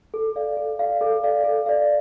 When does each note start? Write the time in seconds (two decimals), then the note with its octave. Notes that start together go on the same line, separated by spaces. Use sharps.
0.14 A4
0.36 D5 F5
0.57 A4
0.79 D5 F5
1.01 A4
1.23 D5 F5
1.44 A4
1.66 D5 F5